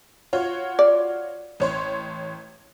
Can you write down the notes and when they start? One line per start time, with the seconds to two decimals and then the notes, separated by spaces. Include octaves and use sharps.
0.33 F4 F#4 C#5
0.79 D5
1.60 A1 C#5 C6